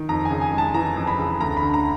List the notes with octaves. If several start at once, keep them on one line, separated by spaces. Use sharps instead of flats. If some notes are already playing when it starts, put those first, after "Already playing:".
Already playing: D#3
F2 A#5
G#5
C#3
G#5
G#3
A5
E3 A#5
F2
B5
C#3
D2 A#5
B5
D3
A#5